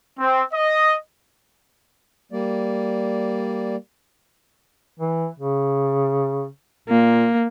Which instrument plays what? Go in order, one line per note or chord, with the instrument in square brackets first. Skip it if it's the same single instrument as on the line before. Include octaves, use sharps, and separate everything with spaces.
[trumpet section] C4
D#5
[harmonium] G3 A#3 D5
[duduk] E3
C#3
[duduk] A#2 [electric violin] A#3